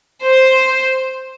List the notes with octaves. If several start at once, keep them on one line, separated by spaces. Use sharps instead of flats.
C5